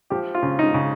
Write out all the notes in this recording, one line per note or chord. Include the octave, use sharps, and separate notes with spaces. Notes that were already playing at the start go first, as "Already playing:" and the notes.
F3 G4
F4
C#3
D#4
C#3